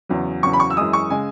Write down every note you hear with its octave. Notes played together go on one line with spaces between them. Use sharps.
E2 C#3 F#3
E2 C#3 F#3 C#6
B5
C#6
E6
F#2 E3 G#3 D#6
C#6
C#3 G#3 G#5